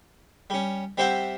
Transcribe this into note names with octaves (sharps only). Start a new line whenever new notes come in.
G3 C#4
G3 C4 C5 E5 F#5 G5